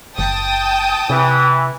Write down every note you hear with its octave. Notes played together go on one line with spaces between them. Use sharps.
F#1 G5 A5 D#6
C3 E3